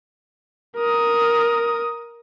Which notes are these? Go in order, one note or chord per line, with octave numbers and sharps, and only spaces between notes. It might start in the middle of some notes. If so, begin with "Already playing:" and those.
A#4 D#6